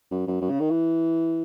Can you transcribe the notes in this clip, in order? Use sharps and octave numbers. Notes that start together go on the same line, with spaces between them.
F#2
F#2
F#2
C#3
D#3
E3